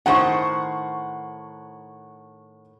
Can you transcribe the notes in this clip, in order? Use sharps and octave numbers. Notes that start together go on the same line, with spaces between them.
A2 D#3 C5 F#5 C#6